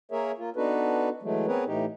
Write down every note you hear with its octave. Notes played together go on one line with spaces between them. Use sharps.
A#3 G#4 A#4 C#5 E5
A#3 F4
B3 D4 D#4 F#4 A4 B4
E3 F#3 G#3 A3
B3 C4 G#4 A#4 B4 C#5
A2 E3 D#4 G4